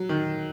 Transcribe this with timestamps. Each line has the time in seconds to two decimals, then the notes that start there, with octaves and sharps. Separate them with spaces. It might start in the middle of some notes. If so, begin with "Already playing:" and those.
Already playing: F#3
0.09 D#3